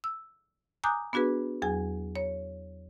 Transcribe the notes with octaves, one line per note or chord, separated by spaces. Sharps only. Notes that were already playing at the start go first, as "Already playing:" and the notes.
E6
G#5 A#5 D6 D#6 F#6 G6
B3 D4 F#4 G#4 B4
E2 F#3 G#4 G#5
C#5